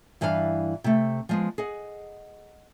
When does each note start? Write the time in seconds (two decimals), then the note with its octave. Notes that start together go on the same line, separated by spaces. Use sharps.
0.21 G2 E3 D4 E4 G#4 F5
0.84 C3 A3
1.29 F3 G#3 B3
1.58 G#4 D#5 F#5